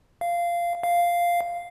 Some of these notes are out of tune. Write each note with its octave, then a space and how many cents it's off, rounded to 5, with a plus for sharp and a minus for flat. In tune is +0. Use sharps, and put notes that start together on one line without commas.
F5 -15
F5 -5